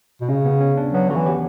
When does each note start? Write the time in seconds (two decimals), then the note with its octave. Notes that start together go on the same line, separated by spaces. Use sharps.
0.21 B2
0.29 C#3 C#4
0.45 B3
0.61 C#4
0.77 D4
0.93 F#3 B3
1.10 D3 F#4
1.15 E3
1.26 G4